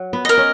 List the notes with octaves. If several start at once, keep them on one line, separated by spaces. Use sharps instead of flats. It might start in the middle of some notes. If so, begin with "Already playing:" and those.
Already playing: F#3
B3
A#4 D#5
C#4